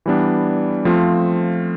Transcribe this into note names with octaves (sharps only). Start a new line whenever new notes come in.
E3 G3 B3 D4
F3 A3 C4 F4